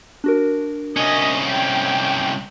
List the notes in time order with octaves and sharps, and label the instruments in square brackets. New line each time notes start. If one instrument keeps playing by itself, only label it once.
[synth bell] D4 F#4 A#4
[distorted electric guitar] C2 C#4 [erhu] D#5
[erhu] G5 [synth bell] B6